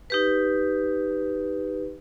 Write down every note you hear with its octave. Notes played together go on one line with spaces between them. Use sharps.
D#4 G4 B4